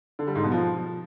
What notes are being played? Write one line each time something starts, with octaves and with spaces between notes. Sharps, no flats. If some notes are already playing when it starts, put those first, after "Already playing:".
D3
G3
G#2
B2
F3